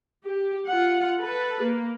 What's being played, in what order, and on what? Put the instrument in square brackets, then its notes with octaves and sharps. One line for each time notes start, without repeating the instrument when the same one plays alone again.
[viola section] G4
F4 F#5
A4 B4
A#3